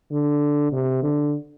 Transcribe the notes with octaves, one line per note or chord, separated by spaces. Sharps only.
D3
C3
D3